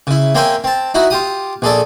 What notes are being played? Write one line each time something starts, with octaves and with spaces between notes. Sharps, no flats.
C#3 E4
A#3 C4 C#5 E5 G5 G#5
C4 A5
D#4 E4 F#4
F4 G4 D#6
A#1 G#4 A4 D5